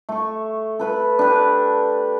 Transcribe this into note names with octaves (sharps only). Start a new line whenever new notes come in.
A3 C#6
A4 B4 B5
D4 G4 B4